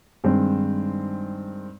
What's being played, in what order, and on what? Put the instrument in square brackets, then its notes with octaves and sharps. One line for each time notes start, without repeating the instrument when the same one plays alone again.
[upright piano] G2 D#3 G#3 C4